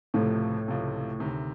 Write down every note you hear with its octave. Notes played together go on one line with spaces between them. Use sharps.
C#2 A2 C3 F3
C#2 C3 F3
D2 C3 D#3